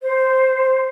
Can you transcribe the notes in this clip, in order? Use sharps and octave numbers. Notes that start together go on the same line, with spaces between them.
C5